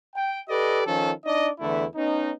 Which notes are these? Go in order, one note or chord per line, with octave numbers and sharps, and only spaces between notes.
G5
G4 A4 B4 D5 D#5
D#3 F3 C#4 A4
D4 D#4 D5 D#5
E2 D3 E3 A3 E4
B3 C#4 D#4